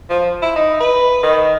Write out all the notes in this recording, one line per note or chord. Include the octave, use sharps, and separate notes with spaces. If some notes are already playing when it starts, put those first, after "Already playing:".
F3
E4
D#4
B4
D#3